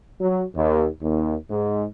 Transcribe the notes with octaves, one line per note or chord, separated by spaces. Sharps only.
F#3
D#2
D#2
G#2